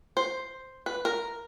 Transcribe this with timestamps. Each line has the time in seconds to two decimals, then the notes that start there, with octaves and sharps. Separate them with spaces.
0.17 C5
0.86 B4
1.05 A#4